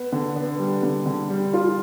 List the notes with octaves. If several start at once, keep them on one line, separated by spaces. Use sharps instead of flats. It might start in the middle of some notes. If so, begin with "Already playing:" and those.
Already playing: B3
D3
B3
G3
D3
D3
G3
F4